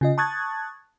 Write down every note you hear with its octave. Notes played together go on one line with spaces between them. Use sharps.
C#3 F4 D#5
A5 C#6 D#6 F#6 G#6 A6